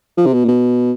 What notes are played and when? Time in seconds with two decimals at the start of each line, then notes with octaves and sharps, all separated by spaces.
0.17 F3
0.26 C3
0.33 B2
0.45 A#2
0.48 B2